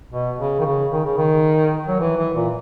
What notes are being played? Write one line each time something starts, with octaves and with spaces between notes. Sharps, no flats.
B2
C#3
D#3
C#3
D#3
C#3
D#3
F#3
E3
E3
A#2